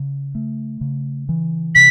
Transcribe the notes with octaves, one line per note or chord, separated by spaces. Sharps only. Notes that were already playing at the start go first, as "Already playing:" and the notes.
Already playing: C#3
A3
C#3
E3
C3 B6